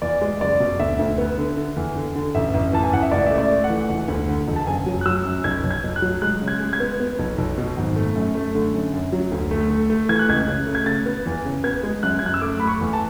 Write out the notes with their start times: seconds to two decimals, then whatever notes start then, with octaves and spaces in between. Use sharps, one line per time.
0.02 E2 D5
0.21 G#3
0.41 F#1 D5
0.60 B2
0.80 D2 E5
0.99 D2
1.18 B3
1.38 D3
1.57 D3
1.76 E2
1.96 D3
2.15 D3
2.35 A1 E5
2.54 A1
2.73 E3 A5
2.84 G#5
2.93 A1 F#5
3.03 E5
3.11 C#2 D5
3.26 A3 E5
3.38 D5
3.50 A3
3.64 F#5
3.70 E3
3.89 E1
4.08 D2
4.29 D3
4.48 E1
4.56 A5
4.67 F#1 G#5
4.86 F#3
5.01 F#6
5.05 F#3 E6
5.25 F#2
5.44 B1 G#6
5.63 B1
5.71 G#6
5.84 B1
5.96 F#6
6.02 F#3
6.22 G#3 F#6
6.41 C#3
6.48 G#6
6.60 G#3
6.73 G#6
6.80 B3
7.00 B3
7.19 B1
7.38 B1
7.57 B2
7.77 G#1
7.96 A3
8.15 F#2
8.35 A3
8.55 D3
8.73 F#2
8.93 F#2
9.12 F#3
9.31 D2
9.51 A3
9.70 A3
9.90 A3
10.09 E3 G#6
10.19 F#6
10.29 C#2 G#6
10.47 C#3
10.67 A3
10.75 G#6
10.86 C#3 A6
11.06 B3
11.26 E2
11.45 C#3
11.64 B3 G#6
11.83 G#3
12.03 F#2 F#6
12.19 G#6
12.22 F#2 F#6
12.34 E6
12.41 A3 D6
12.60 A3 B5
12.67 C#6
12.81 E2
12.93 A5